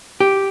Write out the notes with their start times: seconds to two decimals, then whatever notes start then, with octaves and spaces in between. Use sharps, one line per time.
0.20 G4